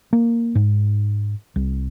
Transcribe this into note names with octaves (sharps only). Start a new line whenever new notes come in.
A#3
G#2
C2